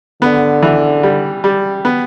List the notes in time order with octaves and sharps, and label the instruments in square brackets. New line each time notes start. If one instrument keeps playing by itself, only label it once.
[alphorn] D3 [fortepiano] B3
[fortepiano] E3
G3
G3
B3